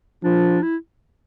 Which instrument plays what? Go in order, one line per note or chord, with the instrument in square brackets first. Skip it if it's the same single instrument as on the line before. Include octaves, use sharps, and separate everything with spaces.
[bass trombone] F3 [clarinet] D4
[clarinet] E4